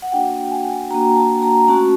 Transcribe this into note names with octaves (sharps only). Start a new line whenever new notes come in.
F#5
A#3 D4 F#4 G5
G#5
A#3 D4 F#4 A#5
A5
A#5
A3 C#4 F#4 A5